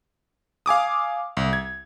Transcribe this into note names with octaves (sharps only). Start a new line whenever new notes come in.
F5 G#5 D6 D#6
C2
G#6